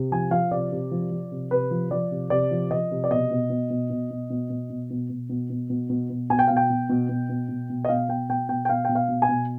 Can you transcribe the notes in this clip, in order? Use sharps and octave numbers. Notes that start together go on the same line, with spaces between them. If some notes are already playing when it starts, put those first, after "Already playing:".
Already playing: C3
F3 G#5
F3 F5
C3 D5
C3
F3
F3
C3
C3 B4
F3
F3 D5
C3
C3 D5
F3
F3 D#5
C3
D5
B2 D#5
B2
B2
B2
B2
B2
B2
B2
B2
B2
B2
B2
B2
B2
B2
B2
B2 G#5
G5
B2 F5
G5
B2
B2
B2
B2
B2
B2
D#5
B2 F5
B2 G5
B2 G5
B2 G5
G5
B2 F5
B2 G5
F5
B2
G#5
B2